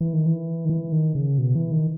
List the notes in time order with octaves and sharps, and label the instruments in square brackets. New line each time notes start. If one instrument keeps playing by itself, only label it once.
[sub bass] E3
D#3
E3
D#3
E3
D#3
C#3
B2
E3
D#3